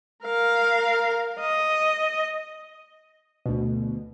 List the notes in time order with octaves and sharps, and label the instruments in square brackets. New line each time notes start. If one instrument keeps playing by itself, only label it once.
[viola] A#4 F5
D#5
[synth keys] D2 B2